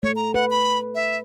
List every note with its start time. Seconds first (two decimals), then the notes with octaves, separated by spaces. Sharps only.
0.03 A3 C#5
0.16 A#5
0.34 B4 F#5
0.50 B5
0.95 E5